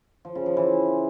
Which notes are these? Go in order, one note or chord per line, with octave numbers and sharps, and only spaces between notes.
F3
C#3
F3
E3